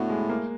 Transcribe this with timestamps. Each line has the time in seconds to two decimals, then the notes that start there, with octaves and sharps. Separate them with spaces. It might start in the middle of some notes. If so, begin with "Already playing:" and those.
Already playing: A2 B3 D4 F#4
0.10 G#3
0.30 A#3